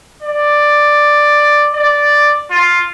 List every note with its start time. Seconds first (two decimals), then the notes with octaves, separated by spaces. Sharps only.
0.23 D5
1.74 D5
2.51 F4